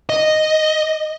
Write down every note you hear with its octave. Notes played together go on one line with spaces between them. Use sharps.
D#5